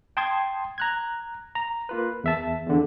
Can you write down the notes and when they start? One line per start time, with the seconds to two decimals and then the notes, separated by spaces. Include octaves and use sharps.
0.17 G5 A5 C6 D#6 G#6
0.78 A#5 F#6 G#6
1.55 A#5
1.89 A#3 F4 B4
2.24 E2 E5 A5
2.66 E2 D3